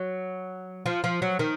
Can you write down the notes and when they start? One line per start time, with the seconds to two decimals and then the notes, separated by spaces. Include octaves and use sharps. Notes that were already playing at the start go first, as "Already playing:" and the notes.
Already playing: F#3
0.86 F3
1.04 F3
1.22 F#3
1.39 D#3